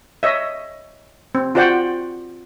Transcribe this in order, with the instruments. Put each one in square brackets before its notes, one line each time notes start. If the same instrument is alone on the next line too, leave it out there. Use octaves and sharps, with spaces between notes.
[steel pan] C#5 D#5 E5
C4
F4 F#4 C5 D5 F#5 G5